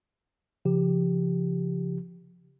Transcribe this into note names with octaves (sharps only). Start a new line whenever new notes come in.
C#3 F3 G4